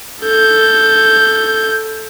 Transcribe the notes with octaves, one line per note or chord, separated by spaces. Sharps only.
A4 G6